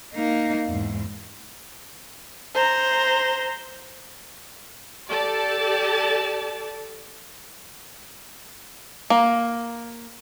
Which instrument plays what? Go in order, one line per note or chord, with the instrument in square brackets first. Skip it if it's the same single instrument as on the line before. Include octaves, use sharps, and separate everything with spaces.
[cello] A#3 D#4
E2 G#2
[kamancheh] C5 A#5
[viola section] G4 A4 D5 A5
[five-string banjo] A#3